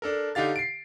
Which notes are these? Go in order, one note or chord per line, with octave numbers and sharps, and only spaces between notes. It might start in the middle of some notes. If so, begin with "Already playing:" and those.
D4 A4 A#4
D3 D#4 G4 F5 A6
C7 D7